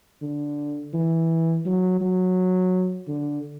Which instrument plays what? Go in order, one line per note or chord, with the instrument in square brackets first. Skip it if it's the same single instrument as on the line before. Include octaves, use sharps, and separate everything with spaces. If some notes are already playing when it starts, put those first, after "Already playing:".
[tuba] D3
E3
F#3
F#3
D3